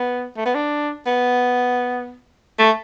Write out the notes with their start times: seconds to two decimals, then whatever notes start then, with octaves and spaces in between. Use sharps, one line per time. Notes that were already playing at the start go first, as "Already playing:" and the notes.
Already playing: B3
0.37 A3
0.45 B3
0.55 D4
1.06 B3
2.59 A3